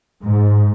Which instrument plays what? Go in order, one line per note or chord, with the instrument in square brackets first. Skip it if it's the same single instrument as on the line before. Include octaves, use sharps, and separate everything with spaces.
[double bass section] G#2